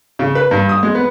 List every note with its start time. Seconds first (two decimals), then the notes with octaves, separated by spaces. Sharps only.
0.19 C#3
0.35 B4
0.51 G2
0.69 D#6
0.83 G#3
0.95 B3